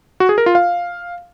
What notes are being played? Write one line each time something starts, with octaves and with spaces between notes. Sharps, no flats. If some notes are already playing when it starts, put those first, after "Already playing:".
F#4
G#4
A#4
F4
F5